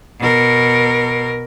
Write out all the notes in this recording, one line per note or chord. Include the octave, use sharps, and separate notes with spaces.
B2 A#4